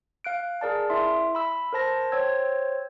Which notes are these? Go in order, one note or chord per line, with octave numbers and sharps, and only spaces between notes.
F5 F#6 D7
G#4 A#4 D5 A5
E4 E5 C6
B5 E6
A#4 C5 A5 A#6
C5 C#5 G5 E6 G#6